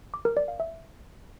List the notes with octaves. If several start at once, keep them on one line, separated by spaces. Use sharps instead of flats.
D6
A#4
D5
F5
E5